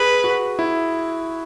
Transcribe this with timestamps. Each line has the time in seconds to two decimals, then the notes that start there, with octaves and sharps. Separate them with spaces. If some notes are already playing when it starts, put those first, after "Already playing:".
Already playing: G#4 B4
0.24 F#4
0.59 E4